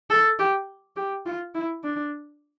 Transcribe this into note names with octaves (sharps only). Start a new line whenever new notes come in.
A4
G4
G4
F4
E4
D4